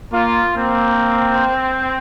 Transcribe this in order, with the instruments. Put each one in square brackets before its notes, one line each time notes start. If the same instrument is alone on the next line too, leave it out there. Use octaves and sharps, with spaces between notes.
[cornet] A#3 [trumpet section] F4
[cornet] A#3 [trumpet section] C4